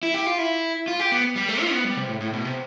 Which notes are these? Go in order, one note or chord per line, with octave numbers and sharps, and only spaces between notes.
E4
G4
F4
E4
F4
G4
B3
G3
A3
F4
B3
G3
C3
A2
A2
B2
C3